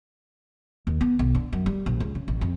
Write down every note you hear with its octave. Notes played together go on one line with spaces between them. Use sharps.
D#2
B3
B1
D3
F#2
G3
A#1
C#2
C#3
A1
F2